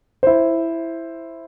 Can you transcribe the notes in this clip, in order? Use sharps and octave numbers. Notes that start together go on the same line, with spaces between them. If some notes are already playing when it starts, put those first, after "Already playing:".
E4 C5